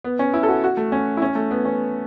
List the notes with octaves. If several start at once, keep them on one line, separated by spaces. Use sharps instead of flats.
B3
C#4
E4
A4
F#4
F#4
A3
C#4
E4
C#4
A3
B3
C#4